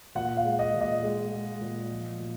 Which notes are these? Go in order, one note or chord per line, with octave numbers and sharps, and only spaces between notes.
A#2 F#5
F5
G#3
D#5
A#2
D#5
G#3
G#3
A#2
F3
A#2